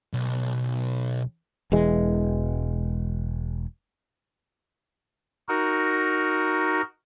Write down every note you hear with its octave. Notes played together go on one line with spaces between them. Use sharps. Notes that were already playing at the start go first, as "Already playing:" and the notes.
B1
E1 E3 G#3
D#4 F#4 A#4